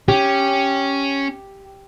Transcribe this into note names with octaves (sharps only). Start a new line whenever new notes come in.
C#4 G4